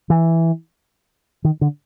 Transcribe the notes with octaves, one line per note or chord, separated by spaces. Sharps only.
E3
D#3
D3